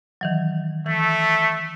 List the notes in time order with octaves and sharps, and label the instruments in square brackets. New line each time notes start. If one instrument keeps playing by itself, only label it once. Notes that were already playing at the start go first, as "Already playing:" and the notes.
[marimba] D#3 E3 F#3
[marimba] E3 [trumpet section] A3